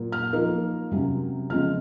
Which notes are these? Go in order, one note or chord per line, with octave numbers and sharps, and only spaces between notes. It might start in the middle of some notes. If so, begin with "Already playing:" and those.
Already playing: A#2 F#3 A#3
F6
F3 A#3 D#4
C3 F#3 C#4
C#3 F3 G#3 C4 F6